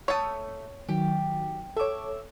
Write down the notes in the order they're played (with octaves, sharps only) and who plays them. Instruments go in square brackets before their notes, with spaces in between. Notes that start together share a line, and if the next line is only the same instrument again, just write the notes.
[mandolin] A3 D#6 [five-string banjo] C#5 A5
[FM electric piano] D#3 F#3 [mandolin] G4
[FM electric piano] A4 C#5 [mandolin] E5 D6